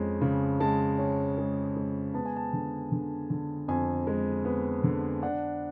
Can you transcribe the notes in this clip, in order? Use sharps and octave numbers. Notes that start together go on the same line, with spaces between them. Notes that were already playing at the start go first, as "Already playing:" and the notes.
Already playing: F2 G#3 C#4
C#3
G#3 A5
C#4
G#3
G#3
B3 A5
G#5
A5
D3
D3
D3
F2 G#5
G#3
B3
D3
D4 F#5